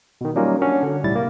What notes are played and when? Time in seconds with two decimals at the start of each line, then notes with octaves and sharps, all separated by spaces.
0.21 B2 D#3
0.36 F#3 G3 A#3 C#4 D#4 F4
0.62 C#4 D4 F#4
0.83 D3
1.04 B1 A2 G3 E4 A6
1.15 C3 A#3